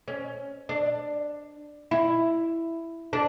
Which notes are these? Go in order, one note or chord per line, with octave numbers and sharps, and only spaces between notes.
C#4
D4
E4
D4